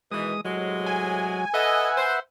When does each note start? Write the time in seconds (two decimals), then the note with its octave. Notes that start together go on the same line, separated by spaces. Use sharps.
0.12 B2 D#3 E3 G#3 D#6
0.45 A2 C3 F#3 G#3
0.86 G#5
1.54 A4 B4 D#5 E5 F#5
1.96 C5